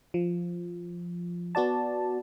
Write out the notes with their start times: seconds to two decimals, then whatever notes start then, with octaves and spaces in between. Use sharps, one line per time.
0.14 F3
1.55 B3 F#4 D5 A5